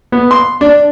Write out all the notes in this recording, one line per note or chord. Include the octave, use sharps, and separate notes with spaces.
B3
C6
D4